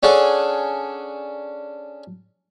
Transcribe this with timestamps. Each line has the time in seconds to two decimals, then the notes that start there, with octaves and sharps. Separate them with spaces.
0.03 C#4 D4 G#4 A4 F#5